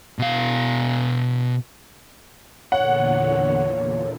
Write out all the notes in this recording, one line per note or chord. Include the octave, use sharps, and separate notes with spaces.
B2 F5
E2 A#2 D3 C#5 F#5